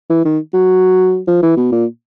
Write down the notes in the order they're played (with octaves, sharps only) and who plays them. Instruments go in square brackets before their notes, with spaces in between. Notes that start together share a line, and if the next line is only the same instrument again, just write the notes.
[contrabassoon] E3
D#3
F#3
F3
E3
B2
A#2